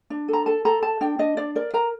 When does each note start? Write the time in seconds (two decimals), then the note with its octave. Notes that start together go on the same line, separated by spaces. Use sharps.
0.10 D4
0.28 A4
0.33 A#5
0.46 A4 A5
0.65 A4 A#5
0.83 A4 A5
1.01 D4 G5
1.19 D4 D#5
1.37 D4 D5
1.55 A#4 D5
1.74 A#4 A#5